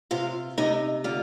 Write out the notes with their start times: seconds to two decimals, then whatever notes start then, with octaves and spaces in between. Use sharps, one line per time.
0.11 C3 F4 F5
0.58 C3 D#4 D#5
1.04 D3 F4